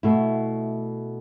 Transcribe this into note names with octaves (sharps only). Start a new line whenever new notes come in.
B2 A3 E4